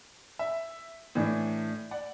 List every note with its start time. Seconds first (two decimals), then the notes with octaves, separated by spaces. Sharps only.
0.39 E5
1.15 A2 E3 D4
1.91 D5 F#5